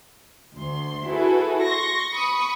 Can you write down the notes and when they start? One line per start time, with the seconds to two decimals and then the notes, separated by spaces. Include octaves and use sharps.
0.55 D2 C6
1.08 E4 F#4 G#4 A4 B4
1.64 C6 C#6 A#6
2.12 B5 C#6 D#6